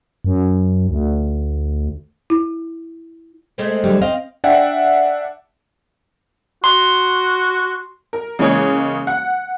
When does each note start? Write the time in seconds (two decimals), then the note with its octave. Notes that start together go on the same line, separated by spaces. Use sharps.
0.25 F#2
0.89 D2
2.30 E4
3.58 G#3 A3 C4
3.84 D3 F#3 G3
4.01 C4 D#5 F5
4.44 D4 D5 E5 F#5 G5
6.64 F#4 C6
8.13 A#4
8.39 C#3 E3 G#3 A#3 G#4 C#5
9.07 F#5